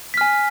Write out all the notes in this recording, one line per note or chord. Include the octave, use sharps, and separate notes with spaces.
G#5 F6 B6